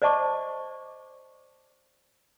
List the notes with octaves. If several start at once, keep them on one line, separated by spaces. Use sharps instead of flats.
C5 D5 D#5 A5 C#6 D6